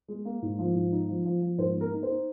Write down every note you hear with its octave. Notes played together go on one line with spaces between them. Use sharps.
G#3
A#3
G#2
F3
G#2
D#4
F3
F3
F3
G#2 C5
A#3
A#4
D#4
C5
D#4